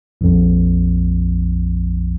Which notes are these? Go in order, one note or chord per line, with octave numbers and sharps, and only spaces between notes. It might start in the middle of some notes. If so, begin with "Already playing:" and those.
A#1 F2